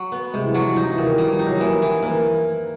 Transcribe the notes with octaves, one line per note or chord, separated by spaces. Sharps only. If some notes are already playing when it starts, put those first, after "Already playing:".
Already playing: F#3
B3
C3 G#3
E3
F3 F#3
F3
F3 D#4
E3
A#2
D#3
E3 G3
F3
D#4
F#3
E3 A#3
E3
E3 A#3